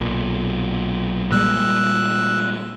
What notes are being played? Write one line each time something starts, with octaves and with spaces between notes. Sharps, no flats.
B1 A#2
A#2 G3 G#3 E6 F#6